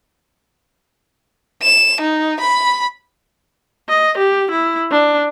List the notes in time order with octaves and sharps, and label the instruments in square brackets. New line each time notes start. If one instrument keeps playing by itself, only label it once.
[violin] E7
D#4
B5
[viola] D#5
G4
E4
D4